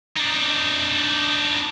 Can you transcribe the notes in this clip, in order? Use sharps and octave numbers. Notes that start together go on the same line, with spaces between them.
D4 D#4